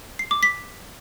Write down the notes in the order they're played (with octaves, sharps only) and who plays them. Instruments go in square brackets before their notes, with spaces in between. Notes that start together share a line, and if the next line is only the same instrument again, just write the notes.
[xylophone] C7
D6
B6